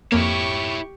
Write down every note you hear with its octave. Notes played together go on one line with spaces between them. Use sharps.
F2 A#3 E4 G4 C#5 C#6